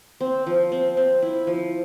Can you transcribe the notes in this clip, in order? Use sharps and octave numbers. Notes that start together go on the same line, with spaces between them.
C4
F3
C4
C4
E4
F3